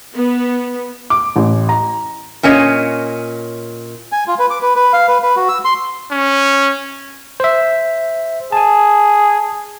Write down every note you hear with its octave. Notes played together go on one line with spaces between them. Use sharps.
B3
D6
A1
A#5
A#2 C#4 C#5 D#5
G#5
F4
B4
D6
B4
B4
F5
B4
B4
F#4
E6
C6
C#4
C5 E5
G#4 G#5 A5